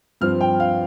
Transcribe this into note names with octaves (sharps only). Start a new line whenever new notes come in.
G2 F3 C4 F6
G5
F5